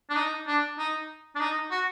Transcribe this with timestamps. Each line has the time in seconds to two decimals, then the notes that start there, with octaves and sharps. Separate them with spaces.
0.10 D4
0.16 D#4
0.47 D4
0.78 D#4
1.36 D4
1.40 D#4
1.71 F#4